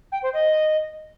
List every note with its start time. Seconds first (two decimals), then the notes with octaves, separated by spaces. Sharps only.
0.12 G5
0.22 C5
0.33 D#5